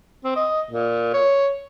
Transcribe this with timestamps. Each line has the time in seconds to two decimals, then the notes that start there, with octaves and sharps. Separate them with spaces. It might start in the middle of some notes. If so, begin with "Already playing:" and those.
0.24 C4
0.36 D#5
0.70 A#2
1.13 C#5